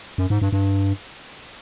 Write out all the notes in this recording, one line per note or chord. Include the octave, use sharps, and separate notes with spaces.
F#2
G#2
G2
G2